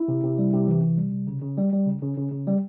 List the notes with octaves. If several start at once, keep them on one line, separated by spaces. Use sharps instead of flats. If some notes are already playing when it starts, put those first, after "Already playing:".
Already playing: E4
C3
C3
G3
C3
E3
C3
G3
C3
C#3
C#3
G3
G3
C#3
C#3
C#3
C#3
G3